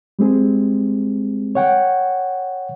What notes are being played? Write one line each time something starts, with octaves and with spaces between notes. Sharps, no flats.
G3 G#3 C4 G#4
C#5 F#5 G5